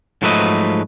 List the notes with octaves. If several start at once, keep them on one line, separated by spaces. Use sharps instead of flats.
G#2 F3 F#3 A3 B4 D#5